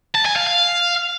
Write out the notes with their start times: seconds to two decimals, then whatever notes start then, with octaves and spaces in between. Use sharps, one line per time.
0.15 A5
0.26 G#5
0.36 F5
0.47 F5